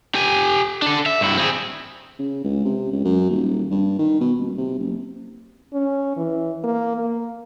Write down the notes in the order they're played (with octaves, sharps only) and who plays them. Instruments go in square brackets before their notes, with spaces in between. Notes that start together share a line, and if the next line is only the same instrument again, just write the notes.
[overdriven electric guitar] G4 G#5
D4 A4
E5
G2 E4
C4 G#4
[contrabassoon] C#3
C#2
C3
C#2
F#2
D#1
G2
D#3
B2
D#1
C3
F#1
[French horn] C#4
E3
A#3
A#3